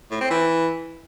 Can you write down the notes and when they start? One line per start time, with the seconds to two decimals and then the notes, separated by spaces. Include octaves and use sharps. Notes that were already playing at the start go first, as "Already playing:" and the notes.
0.11 A2
0.21 C4
0.31 E3